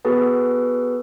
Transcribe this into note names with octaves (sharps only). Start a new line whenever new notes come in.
B3 F#4 G#4 A4 B4